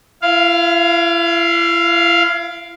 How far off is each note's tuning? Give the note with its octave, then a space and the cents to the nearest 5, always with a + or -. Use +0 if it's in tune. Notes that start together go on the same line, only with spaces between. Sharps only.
E4 +40 F5 +0